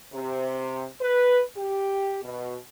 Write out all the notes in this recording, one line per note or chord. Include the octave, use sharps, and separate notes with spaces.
C3
B4
G4
B2